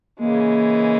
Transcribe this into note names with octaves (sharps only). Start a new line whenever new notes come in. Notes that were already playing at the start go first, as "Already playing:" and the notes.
C#3 E3 G#3 A#3